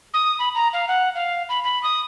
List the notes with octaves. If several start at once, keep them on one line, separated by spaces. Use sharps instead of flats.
D#6
B5
A#5
F5
F#5
F5
B5
B5
D#6